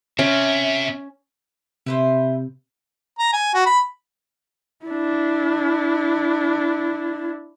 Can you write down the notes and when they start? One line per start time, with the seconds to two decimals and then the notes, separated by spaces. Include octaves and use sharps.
0.19 C3 C#4 E5
1.86 C3 E4 B4 C5
3.19 A#5
3.33 G#5
3.55 F#4
3.66 B5
4.85 D4 E4